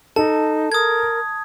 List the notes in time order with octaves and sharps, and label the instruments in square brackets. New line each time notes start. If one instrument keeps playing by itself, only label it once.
[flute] D#4 [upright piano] A4 [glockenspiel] A5
[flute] A#4 [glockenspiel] D#6 G#6